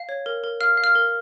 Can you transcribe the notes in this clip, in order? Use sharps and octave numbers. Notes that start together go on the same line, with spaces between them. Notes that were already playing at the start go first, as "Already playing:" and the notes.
Already playing: F5
C#5
A#4
A#4
F5 F6
F5
F6
A#4